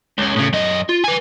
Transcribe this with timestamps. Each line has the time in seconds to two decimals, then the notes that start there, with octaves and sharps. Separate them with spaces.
0.18 C#2 C#4
0.36 A2 C#3
0.53 F#2 D#5
0.89 F4
1.04 B4 G#5